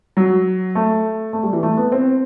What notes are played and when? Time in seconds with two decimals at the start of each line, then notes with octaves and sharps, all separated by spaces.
0.17 F#3
0.75 A3
1.33 A3
1.43 G3
1.53 E3
1.63 A3
1.77 B3
1.92 C4